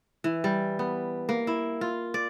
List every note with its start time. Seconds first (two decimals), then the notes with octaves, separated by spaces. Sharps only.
0.24 E3
0.44 G3
0.79 B3
1.29 A#3
1.47 E4
1.81 F4
2.14 D5